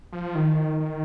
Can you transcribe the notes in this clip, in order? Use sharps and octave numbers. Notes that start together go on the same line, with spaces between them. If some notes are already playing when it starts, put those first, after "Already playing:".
F3
D#3
D#3